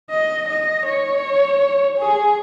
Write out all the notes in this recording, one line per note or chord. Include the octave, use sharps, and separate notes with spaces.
D#5
D#5
C#5
G#4